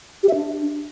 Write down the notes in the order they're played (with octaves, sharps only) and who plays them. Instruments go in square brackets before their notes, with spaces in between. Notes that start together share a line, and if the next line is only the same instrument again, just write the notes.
[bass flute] G4
E5
D4